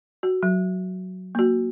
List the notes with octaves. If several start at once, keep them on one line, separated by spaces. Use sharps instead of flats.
F#4
F#3
A#3 F#4